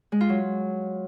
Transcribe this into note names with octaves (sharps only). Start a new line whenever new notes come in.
G#3
F4
F#3